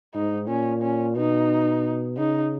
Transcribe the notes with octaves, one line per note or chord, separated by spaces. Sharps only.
G#2 D#4
A#2 C#4
C#4
B2 D#4
C#3 D#4